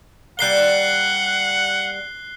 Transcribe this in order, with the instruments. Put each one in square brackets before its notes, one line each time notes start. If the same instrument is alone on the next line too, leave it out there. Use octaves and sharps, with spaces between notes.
[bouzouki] G3 A#3 [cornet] F#5 [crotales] F#6 C7 G7